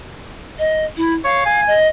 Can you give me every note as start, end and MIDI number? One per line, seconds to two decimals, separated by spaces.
0.58 0.85 75
0.96 1.13 64
1.24 1.43 73
1.24 1.60 77
1.45 1.75 80
1.67 1.87 75